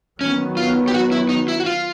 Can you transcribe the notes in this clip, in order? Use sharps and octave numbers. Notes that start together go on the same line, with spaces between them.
D#3 F#3 B3 C#4
F4
G4
F#4
E4
D#4
E4
F#4
F4